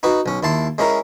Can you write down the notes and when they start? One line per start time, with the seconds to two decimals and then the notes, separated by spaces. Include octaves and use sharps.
0.03 D#4 F#4 B4
0.26 B1 C#4
0.43 D#2 E4 A5 C6
0.78 G#3 C#4 E4 A#4